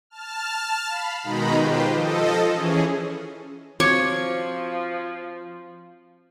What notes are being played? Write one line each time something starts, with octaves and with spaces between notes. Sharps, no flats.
A5 F6
F5 B5
B2 D#3 G#3 D#4 A#5 B5
F4 G4 B4 C5 G5
F3 A4 D#5
E3 C#4 G#4
F3 C4 F#4 C#5 D6